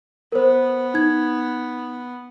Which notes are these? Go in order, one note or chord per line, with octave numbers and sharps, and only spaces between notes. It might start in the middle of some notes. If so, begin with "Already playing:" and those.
B3 A#4 C5
D#4 G#6